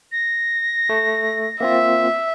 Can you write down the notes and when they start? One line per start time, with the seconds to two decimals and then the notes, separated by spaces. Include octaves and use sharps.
0.12 A#6
0.89 A3
1.61 A#3 C4 F4 E5